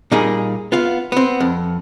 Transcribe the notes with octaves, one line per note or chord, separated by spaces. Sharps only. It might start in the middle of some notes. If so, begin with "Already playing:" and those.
A#2 G3 A#3 D#4 G#4
B3 F4 F5
B3 C4
F2